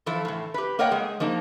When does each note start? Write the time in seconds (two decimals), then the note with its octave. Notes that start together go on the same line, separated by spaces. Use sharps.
0.06 E3 F3 E4 A4
0.25 A2 E3
0.54 G4 B4
0.79 A#3 A#4 C#5 D#5 F#5 G5
0.91 G#3 G#4
1.20 F3 A#3 D#4 A5